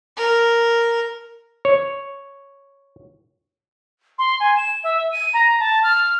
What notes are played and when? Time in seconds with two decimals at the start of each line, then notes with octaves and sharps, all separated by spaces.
0.17 A#4
1.65 C#5
4.18 C6
4.40 G#5
4.57 E7
4.84 E5
5.12 D#7
5.34 A#5
5.60 A5
5.83 F6